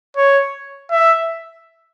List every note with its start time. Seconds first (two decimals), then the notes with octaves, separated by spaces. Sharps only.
0.17 C#5
0.91 E5